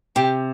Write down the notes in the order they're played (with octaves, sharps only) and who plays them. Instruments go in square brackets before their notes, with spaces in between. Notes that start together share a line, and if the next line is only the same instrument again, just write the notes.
[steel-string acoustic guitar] C3 [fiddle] G4